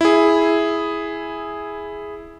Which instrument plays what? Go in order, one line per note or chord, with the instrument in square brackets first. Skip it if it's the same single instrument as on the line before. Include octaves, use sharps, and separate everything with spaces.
[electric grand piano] E4 G#4